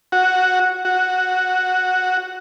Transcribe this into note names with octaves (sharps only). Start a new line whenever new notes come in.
F#4
F#4